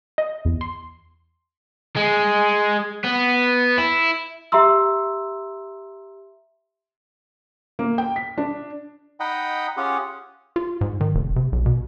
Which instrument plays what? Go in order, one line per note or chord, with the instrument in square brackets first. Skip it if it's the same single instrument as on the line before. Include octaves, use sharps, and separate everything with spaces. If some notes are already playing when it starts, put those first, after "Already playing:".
[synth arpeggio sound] D#5
E2
C6
[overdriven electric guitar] G#3
B3
E4
[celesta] G4 E5 A#5 C6 E6
[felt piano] A#3
G5
B6
D4
[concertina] D#4 D#5 F#5 G5 B5
C#4 F4 G4 G#4 F#5
[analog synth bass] F4
G#2
D#3
F1
C3
B1
B2